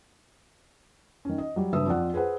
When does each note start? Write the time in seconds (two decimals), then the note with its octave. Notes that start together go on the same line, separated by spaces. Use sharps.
1.25 D#3 C#4
1.38 D#5
1.56 F#3 G3
1.73 F#1 G2 B4 E5 D#6 E6
1.86 F2 F4 D5 F#5
2.14 G#4 B4 C5 F#5